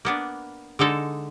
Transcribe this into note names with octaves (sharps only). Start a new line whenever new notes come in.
A#3 B3 D4
D3 G#3 D#4 A4